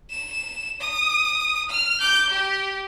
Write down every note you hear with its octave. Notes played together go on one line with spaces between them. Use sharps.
E7
D#6
F6
D6 G6
G4